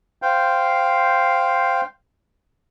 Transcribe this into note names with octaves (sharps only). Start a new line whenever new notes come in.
C5 F5 G5